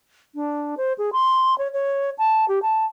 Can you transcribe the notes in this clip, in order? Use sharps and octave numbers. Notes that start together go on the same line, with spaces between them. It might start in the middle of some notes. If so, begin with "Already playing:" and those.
D4
C5
G#4
C6
C#5
C#5
A5
G4
A5